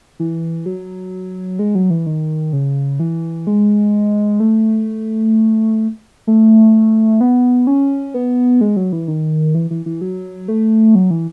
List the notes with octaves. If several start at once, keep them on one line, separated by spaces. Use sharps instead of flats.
E3
F#3
G#3
F#3
E3
D#3
C#3
E3
G#3
A3
A3
B3
C#4
B3
G#3
F#3
E3
D#3
E3
E3
E3
F#3
A3
F#3
E3